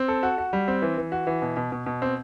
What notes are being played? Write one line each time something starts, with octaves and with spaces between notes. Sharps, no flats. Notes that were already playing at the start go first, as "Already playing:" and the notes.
Already playing: C4
A4
F#4
F#4
G3
C4
E3
E3
F#4
E3
B2
B2
B2
B2
C4